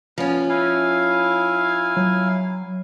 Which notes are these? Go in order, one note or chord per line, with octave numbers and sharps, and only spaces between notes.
F3 B3 C#4
E4 F5 G#5
F#3